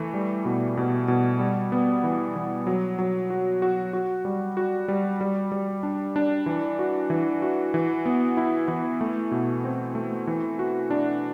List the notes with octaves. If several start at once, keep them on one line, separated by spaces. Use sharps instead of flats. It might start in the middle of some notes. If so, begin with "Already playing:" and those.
Already playing: E3 A3
G3
B2
B2
B2
G3
B3
E3
E3
F#3
F#3
F#4
F#4
F#4
G3
F#4
G3
G3
G3
D4
D4
E3
F#4
E3
F#4
E3
B3
E4
E3
A3
B2
C4
A3
E3
F#4
D4